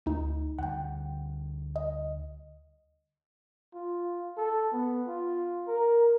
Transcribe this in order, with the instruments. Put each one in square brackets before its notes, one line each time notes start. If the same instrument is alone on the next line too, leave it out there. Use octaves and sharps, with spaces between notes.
[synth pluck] D2 D#4
[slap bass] D2 D3 G3 [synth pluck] F#5 G5
[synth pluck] D#5
[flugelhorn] F4
A4
B3
F4
A#4